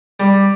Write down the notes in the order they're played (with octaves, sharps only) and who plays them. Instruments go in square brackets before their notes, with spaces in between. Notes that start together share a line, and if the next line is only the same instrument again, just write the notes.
[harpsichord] G3